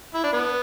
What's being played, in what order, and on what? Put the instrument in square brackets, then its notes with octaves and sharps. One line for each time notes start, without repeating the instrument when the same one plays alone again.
[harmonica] E4
D4
B3